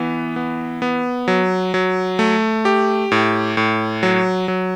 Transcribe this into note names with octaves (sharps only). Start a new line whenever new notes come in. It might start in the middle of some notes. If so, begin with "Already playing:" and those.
Already playing: E3 B3
B3
B3
F#3
F#3
A3
G4
A2
A2
F#3
F#3